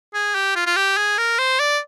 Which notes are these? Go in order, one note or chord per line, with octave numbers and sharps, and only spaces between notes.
G#4
G4
F4
F4
G4
G#4
A#4
C5
D5